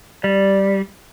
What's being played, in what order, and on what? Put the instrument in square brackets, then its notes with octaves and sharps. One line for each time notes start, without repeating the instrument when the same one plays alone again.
[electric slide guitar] G3 [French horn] D5